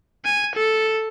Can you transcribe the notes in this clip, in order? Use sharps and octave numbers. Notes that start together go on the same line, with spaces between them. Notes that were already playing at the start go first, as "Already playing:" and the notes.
G#5
A4